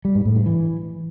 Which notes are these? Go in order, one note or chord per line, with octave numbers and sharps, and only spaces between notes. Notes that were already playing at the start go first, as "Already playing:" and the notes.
G3
G#2
A2
G2
E3